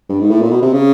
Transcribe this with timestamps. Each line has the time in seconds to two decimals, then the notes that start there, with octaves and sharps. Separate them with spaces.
0.10 G2
0.20 G#2
0.30 A2
0.42 A#2
0.51 B2
0.62 C3
0.73 C#3